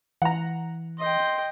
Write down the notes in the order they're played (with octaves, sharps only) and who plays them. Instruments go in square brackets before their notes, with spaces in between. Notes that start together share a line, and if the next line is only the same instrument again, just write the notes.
[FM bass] E3 [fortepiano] F#5 A#5
[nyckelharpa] D#5 G5 [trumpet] C6